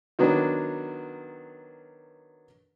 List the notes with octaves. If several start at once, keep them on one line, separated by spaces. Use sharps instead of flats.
D#3 F#3 B3 D4